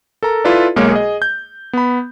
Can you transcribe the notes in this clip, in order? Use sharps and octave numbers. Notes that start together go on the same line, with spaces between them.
A4 A#4 A#5
E4 F4 A4 B4 D5
B1 G#3 A#3 A#4 C#5
G#4 D#5
G6
B3 B5